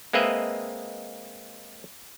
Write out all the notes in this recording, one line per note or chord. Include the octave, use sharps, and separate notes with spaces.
G#3 A#3 C4 B4 D#5 E5